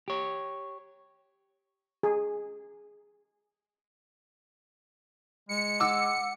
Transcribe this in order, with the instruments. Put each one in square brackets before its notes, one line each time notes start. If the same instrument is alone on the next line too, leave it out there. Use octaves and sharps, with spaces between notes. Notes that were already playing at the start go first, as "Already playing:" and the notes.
[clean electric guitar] G4 C#5
[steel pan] G#4
[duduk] G#3 [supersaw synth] C#7
[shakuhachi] F#5 [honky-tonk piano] D6 E6